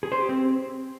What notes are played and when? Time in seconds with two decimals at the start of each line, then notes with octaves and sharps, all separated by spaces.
0.03 G#4
0.12 C5
0.20 G4
0.29 C4